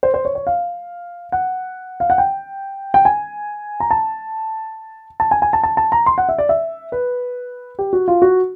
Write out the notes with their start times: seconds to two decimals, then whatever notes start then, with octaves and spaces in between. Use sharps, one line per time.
0.03 C5
0.14 C5
0.25 C#5
0.35 C#5
0.47 F5
1.32 F#5
2.00 F5
2.10 F#5
2.18 G5
2.94 G5
3.05 G#5
3.80 A#5
3.91 A5
5.20 A5
5.31 G#5
5.42 G#5
5.53 A5
5.63 A5
5.77 A5
5.92 A#5
6.06 C6
6.18 F#5
6.29 E5
6.38 D5
6.49 E5
6.92 B4
7.79 G4
7.93 F#4
8.08 F4
8.22 F#4